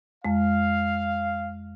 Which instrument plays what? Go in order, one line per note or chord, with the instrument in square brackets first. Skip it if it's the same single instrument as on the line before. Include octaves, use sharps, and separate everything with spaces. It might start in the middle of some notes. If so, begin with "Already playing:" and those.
[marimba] F2 G#3 [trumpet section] F5